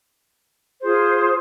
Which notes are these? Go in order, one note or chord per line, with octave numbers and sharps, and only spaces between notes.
F4 G#4 C5